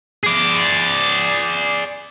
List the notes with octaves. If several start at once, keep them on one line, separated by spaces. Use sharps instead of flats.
G#4 D5